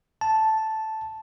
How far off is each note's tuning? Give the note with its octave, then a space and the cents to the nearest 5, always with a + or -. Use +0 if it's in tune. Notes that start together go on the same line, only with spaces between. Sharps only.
A5 -5